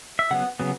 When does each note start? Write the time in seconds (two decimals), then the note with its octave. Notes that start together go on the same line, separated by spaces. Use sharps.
0.19 E5
0.31 C#3 F#3 B3 F#5
0.60 C#3 F#3 B3